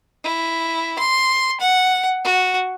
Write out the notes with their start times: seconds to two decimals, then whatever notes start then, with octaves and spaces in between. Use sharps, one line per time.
0.24 E4
0.98 C6
1.60 F#5
2.24 F#4